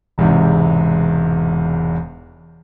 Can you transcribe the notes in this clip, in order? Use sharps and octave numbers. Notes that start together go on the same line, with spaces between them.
E1 E2 G#2 C3